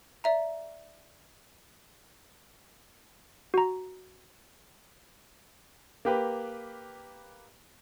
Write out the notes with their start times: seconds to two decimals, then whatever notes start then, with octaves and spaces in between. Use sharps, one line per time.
0.24 D5 E5 A#5
3.54 F#4 A#5
6.05 A#3 G4 B4